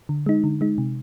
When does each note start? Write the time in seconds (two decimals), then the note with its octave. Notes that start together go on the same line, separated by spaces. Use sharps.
0.09 D3
0.26 G#3 D#4
0.44 D3
0.61 G#3 D#4
0.78 C3